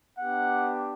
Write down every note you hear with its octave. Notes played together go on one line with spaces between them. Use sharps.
B3 D4 G4 F#5